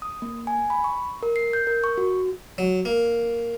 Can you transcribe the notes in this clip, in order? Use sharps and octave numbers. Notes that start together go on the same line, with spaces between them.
D#6
A#3
G#5
B5
C#6
A#4
C7
G6
A#4
C#6
F#4
F#3
A#3